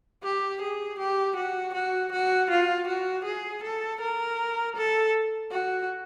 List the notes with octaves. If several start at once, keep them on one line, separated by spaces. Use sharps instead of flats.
G4
G#4
G4
F#4
F#4
F#4
F4
F#4
G#4
A4
A#4
A4
F#4